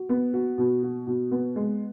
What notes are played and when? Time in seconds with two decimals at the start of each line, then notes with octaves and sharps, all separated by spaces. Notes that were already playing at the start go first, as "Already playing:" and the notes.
Already playing: F#4
0.09 B3
0.34 F#4
0.58 B2
0.83 F#4
1.07 B2
1.31 B3
1.56 G#3